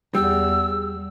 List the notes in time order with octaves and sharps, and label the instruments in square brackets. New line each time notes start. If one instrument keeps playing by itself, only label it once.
[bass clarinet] E2 [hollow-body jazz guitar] G3 [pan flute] E6